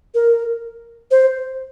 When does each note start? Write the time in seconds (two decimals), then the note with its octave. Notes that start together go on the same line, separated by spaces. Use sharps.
0.15 A#4
1.11 C5